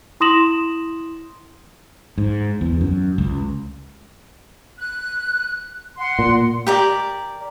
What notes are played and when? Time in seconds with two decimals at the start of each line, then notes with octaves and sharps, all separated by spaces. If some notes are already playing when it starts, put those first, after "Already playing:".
0.20 E4 C6 D#6 A#6 E7 F#7
2.18 G#2
2.61 E2
2.81 F#2
3.18 C#2
4.78 F#6
5.97 F#5 C6
6.19 A#2
6.67 G4 A#4 D5